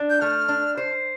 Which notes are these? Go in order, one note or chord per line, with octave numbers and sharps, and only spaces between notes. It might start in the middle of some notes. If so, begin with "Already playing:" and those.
Already playing: D4
G6
A3 F6
D4
C5